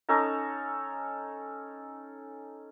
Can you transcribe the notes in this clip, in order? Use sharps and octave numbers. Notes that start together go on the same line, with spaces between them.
C#4 D#4 A4 A#5